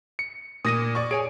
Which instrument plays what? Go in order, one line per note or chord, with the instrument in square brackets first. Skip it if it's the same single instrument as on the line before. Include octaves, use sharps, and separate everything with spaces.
[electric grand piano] C#7
[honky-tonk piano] A#2 [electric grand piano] D#6 A#6 D#7
[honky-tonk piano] D5 C#6
[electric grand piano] G#4 C#5 G#5 [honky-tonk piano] D7